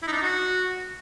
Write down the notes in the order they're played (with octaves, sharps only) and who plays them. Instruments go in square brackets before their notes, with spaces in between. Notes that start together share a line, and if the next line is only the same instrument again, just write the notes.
[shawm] E4
D#4
D4
D#4
F#4